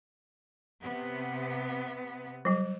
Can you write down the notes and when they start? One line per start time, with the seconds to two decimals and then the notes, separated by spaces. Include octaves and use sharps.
0.81 C3 B3
2.45 F#3 G3